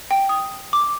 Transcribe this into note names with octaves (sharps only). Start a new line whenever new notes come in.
G5
D#6
D6